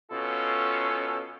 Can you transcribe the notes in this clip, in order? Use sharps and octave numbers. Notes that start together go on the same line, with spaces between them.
B2 C#4 F4 A4